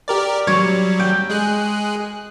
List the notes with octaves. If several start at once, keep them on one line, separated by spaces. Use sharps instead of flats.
G4 A#4 D5
F#3 G3 C#5
G5
G#3 G#4 F#6